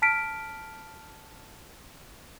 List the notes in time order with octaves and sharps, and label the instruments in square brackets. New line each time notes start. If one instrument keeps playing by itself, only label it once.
[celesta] A5 F6 B6 D7